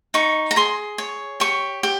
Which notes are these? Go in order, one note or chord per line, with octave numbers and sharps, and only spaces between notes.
D#4 C#6
A#5
G#4 C6
C#5
G4 C#6
G4